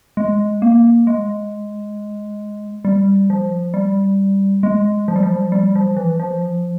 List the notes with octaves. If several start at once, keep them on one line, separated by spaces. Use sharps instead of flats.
G#3
A#3
G#3
G3
F3
G3
G#3
F3
G3
F3
G3
F3
E3
F3